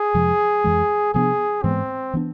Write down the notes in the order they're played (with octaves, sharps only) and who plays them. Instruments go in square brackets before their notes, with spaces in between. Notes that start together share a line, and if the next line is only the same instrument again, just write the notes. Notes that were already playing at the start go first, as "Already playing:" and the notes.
Already playing: [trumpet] G#4
[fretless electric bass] F2 C3 F3 G#3
F2 E3 G#3
[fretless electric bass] C3 F3 B3 D4 [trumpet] G#4
[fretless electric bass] G#2 E3 G#3 B3 [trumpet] C4
[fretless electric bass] E3 B3 D4